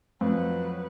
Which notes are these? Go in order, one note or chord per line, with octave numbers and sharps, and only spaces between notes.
F2 F#3 C4 B4